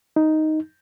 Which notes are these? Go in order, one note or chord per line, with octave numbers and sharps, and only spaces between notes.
D#4